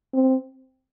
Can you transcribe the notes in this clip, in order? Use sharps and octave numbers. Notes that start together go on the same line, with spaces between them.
C4